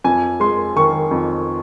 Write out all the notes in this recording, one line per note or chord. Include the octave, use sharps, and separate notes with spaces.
F2 G#5
G#3 C6
D#3 C#6
F2